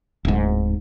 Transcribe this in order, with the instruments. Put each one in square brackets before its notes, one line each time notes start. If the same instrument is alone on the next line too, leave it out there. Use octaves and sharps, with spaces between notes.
[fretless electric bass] D1 G#2